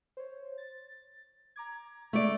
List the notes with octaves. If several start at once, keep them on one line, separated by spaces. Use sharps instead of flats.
C5 C#5
A6
A#5 D6 G#6
G#3 A3 D5